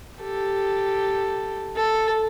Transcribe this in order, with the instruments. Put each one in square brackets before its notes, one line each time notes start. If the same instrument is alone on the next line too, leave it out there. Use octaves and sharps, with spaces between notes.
[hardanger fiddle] G4 A4
A4